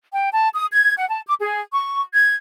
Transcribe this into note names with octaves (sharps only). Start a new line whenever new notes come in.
G5
A5
D#6
G#6
F#5
A5
D6
G#4
C#6
G#6